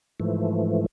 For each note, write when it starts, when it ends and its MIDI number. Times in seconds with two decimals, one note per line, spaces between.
0.20 0.86 44
0.20 0.86 52
0.20 0.86 53
0.20 0.86 57